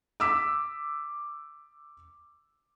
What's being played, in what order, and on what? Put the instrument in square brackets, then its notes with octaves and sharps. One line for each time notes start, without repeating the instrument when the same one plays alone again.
[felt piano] D6 E6 B6